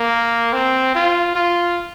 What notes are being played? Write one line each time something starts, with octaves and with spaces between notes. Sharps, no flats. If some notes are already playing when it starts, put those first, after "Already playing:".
Already playing: A#3
C4
F4
F4